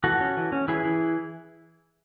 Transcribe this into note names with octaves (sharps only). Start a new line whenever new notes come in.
E3 F#4 A4
C#4
E3
C#4
E3 E4 G#4
E3